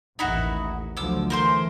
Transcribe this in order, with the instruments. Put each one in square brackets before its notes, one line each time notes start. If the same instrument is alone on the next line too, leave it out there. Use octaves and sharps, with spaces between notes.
[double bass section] A1 D#2 [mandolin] D#4 E4 F#4
[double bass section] D2 F3 F#3 [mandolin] D6 E6
[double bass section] E3 A3 [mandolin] A#4 C5 C6